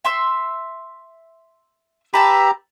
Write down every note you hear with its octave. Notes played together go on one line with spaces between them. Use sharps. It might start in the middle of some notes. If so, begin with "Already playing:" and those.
E5 C6 E6
G4 B4 E5 A5 A#5